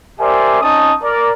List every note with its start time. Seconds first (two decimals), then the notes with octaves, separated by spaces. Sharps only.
0.19 G4 A#4 C5 D5 E5 G#5
0.61 C#4 D#4 A5 D#6
1.02 A#4 D5